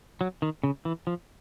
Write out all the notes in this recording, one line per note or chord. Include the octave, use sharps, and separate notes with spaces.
F#3
D#3
C#3
E3
F3